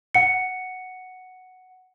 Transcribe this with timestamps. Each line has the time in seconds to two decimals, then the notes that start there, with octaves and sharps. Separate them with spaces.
0.14 F#5 C#7